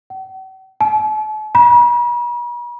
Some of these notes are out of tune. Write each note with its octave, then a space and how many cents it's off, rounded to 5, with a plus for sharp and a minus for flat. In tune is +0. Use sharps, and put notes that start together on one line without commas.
F#5 +45
A5 -40
B5 -45